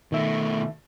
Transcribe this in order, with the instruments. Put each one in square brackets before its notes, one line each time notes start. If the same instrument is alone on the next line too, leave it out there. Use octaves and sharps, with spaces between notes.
[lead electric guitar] B2 A3 [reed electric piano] D#3 E5